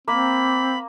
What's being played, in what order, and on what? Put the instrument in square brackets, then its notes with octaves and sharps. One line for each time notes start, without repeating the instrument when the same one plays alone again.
[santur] A#3 [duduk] C4 [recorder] B5